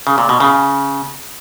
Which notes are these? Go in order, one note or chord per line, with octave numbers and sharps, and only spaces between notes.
C#3
A#2
B2
C#3